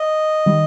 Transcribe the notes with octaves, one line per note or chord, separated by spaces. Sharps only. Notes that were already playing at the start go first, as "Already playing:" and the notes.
Already playing: D#5
D#3 G3